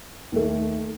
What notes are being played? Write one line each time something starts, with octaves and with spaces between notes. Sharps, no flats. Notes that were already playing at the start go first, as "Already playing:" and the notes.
D#2 D#3 A3